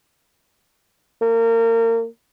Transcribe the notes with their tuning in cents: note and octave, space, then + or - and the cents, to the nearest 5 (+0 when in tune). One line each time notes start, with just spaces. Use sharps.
A#3 -30